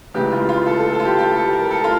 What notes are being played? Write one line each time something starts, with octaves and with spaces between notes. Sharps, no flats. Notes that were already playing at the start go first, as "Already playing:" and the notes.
C#2 C#3 E3 G4
F4
F4
A4
A4
A4
F4
G4
G4
A4
A#4
A4
F4